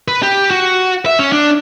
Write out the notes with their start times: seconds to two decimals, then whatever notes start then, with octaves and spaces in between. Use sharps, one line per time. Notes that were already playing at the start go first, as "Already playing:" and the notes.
0.08 B4
0.23 G4
0.51 F#4
1.06 E5
1.19 C#4
1.32 D4